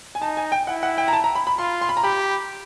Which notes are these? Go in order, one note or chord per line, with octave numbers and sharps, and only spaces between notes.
G#5
D#4 A5
G#5
G5
E4 F#5
F#5
G5
A#5
A5
A#5
B5
B5
F4 C6
C6
B5
A#5
G4 B5